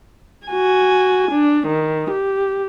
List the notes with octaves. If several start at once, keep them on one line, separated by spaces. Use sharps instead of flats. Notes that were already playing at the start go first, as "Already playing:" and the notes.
F#4 G#5
D4
D#3
G4